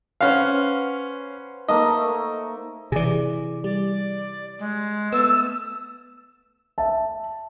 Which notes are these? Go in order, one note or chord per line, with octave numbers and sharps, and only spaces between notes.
C#4 B4 C5 F5 F#5
A3 A#3 D#4 D#5
C3 E3 G#4 D5
G3 D5
G#3
A3 B3 E6
E5 A5